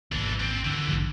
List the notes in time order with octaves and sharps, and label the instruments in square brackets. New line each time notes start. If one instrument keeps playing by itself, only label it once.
[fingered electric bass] G#1 D#2 [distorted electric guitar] E3 D4
[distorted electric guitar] C4 D4
D3 E3
[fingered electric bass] A#1 D#2 G#2